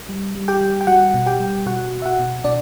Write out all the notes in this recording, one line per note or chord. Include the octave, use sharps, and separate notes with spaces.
G3
G3
G4 G5
G3
G5
G3 F#4 F#5
B2
G4 G5
G3
B2 F#4 F#5
B2
E5
F#4 F#5
B2
B2 D4 D5